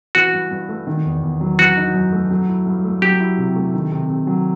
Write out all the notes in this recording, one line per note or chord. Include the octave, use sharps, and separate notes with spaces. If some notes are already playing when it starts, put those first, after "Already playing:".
E3 F#4
G2
G2
A3
D#3
E2
E2
F#3
E3 F#4
D#4
F#2
A3
F#3
E4
G2
A3
F#3 G4
E4
C3
A3
D#3
C3
C3
F#3